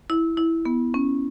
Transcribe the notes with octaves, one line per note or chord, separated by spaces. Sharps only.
E4
E4
B3
C#4